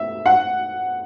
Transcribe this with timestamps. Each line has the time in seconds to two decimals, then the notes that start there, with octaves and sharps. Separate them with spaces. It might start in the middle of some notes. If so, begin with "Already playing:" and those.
Already playing: E5
0.26 F#5